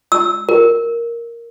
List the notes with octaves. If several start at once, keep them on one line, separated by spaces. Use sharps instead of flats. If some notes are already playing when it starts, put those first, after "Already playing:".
E6
A#4